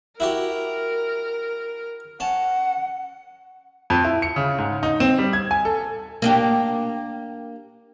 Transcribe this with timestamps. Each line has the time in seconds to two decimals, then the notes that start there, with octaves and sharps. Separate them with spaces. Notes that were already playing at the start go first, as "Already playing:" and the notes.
0.20 E4 F#4 G4 A#4
2.20 C#4 F#5 A5
3.90 F2
4.05 E4
4.22 C#7
4.36 C#3
4.58 G#2
4.83 D#4
5.00 C4
5.18 G3
5.33 G#6
5.51 G#5
5.65 A4
6.22 A#3 D4 G4